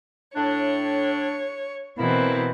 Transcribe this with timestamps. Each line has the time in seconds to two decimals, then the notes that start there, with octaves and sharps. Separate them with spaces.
0.36 A2 D4 C#5
1.98 B2 E3 A#3 C4 E4